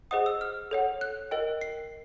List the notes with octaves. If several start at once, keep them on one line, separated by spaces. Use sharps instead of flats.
G#4 C5 D#5 F#5 D#6
E6
F6
A4 C#5 F#5
F#6
A#4 D#5 G5
C7